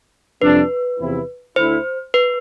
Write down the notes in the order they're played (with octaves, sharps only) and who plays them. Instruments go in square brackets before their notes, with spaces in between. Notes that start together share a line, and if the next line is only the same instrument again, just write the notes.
[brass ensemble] F2 C3 G3 D4 [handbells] B4
[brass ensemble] E2 C3 F3 C4 E4
[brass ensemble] D2 D3 A3 E4 [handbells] C5
[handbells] B4